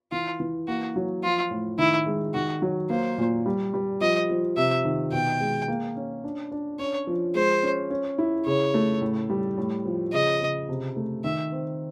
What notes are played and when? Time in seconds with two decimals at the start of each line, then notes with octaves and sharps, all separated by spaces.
0.12 E3 F4
0.40 E3
0.68 A#3 F#4
0.96 F#3
1.24 F3 F4
1.51 A2
1.79 D#3 E4
2.07 G#3
2.34 D#3 F#4
2.62 F#3
2.90 A#3 C5
3.18 A#2
3.46 G3
3.74 G3
4.01 F3 D#5
4.29 F3
4.57 C3 E5
4.85 D#3
5.12 B2 G5
5.40 G#3
5.68 A#3
5.96 C#4
6.24 D4
6.52 D4
6.79 C#4 C#5
7.07 F3
7.35 G#3 C5
7.63 C#4
7.90 C#4
8.18 E4
8.46 C#3 C#5
8.74 A3
9.01 A2
9.30 G3
9.58 A2
9.86 F3
10.13 C#3 D#5
10.41 C#3
10.69 C3
10.96 A3
11.24 D#3 E5
11.52 C4